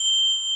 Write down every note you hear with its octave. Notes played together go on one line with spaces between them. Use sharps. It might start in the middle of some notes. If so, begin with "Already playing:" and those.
Already playing: G7